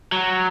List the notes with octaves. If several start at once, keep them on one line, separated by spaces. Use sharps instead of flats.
F#3